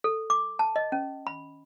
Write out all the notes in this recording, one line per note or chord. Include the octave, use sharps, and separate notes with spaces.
A4
D6
A5
D#5
C#4
B5